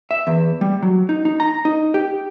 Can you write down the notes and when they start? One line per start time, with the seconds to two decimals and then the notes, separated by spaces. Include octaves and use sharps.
0.11 E5
0.27 E2
0.61 G3
0.82 F#3
1.09 D#4
1.25 D#4
1.40 A#5
1.65 D#4
1.94 G4